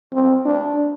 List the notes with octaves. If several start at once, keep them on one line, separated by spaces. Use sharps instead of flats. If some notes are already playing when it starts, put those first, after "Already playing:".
C4
D4